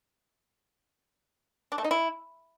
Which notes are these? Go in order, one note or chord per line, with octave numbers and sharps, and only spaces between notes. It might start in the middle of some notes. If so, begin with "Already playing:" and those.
D4
A3
D#4
E4